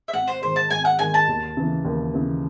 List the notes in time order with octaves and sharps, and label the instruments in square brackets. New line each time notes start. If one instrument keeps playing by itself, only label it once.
[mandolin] E5
[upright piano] G#1 [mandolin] F#5
[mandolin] C5
[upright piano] G#2 D#3 G#3 [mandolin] C5
[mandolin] A5
[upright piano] G#1 [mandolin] G#5
[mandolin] F#5
[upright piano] G#2 D#3 G#3 [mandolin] G#5
[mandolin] A5
[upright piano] D#2
C#3 E3
D#2
C#3 E3